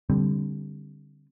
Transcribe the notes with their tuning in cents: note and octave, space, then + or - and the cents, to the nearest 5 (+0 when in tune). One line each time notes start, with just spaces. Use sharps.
D3 -5 G3 +5 C4 +0